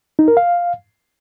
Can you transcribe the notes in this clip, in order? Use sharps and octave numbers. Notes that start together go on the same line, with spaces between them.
D#4
A#4
F5